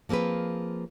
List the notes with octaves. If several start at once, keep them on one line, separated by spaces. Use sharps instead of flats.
F3 A#3 C4 G#4 B4